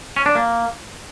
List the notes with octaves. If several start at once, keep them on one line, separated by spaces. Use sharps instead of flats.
C#4
D4
A#3